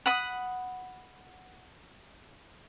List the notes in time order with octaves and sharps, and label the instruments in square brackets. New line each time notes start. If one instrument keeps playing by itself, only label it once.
[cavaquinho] F#5 B5 D#6